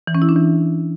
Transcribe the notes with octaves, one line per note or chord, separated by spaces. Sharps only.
E3
C#4
E4
D4
E3